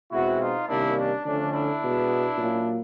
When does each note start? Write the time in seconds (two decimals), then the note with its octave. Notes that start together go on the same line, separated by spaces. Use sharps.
0.11 B2 G#3 C4 E4 F#4
0.39 D#4 F4
0.67 C3 D#3 G3 A#3 C#4 D4 E4
0.96 D4
1.24 D3 F3 A3 C#4 D4
1.52 D4 E4
1.80 B2 G#3 B3
2.36 A#2 F#3 A#3 C#4